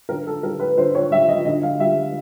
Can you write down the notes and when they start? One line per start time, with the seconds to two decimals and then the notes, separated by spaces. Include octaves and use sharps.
0.09 D3 A#4
0.27 A4
0.43 G3 A#4
0.60 B4
0.78 D3 C5
0.95 C#5
1.11 G3 E5
1.29 D#5
1.45 D3 D#5
1.63 F5
1.80 G3 E5